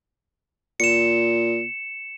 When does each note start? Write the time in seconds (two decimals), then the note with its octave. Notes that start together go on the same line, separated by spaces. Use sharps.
0.80 A#2 C#7 E7